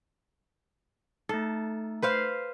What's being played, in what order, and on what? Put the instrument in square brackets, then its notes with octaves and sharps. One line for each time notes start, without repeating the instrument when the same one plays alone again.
[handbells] A3 D#4 [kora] A4
[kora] B4 C5 F5